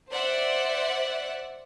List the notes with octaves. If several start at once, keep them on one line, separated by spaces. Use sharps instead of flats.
C5 D5 E5 F#5